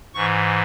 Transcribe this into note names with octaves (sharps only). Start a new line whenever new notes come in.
G#2 E3 C#6